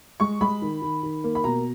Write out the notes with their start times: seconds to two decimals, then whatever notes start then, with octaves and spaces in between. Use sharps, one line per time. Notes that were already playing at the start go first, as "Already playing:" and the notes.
0.20 G#3 C#6
0.41 G#3 B5
0.62 D#3
0.82 D#3
1.03 D#3
1.24 A#3
1.35 B5
1.44 B2 A#5